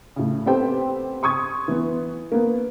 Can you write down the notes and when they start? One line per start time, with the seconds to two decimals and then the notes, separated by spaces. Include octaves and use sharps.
0.16 A2 C#3
0.46 B3 C4 G4 A4 C5 G5
1.23 C6 C#6 D#6 G#6
1.68 E3 B3
2.32 A#3 B3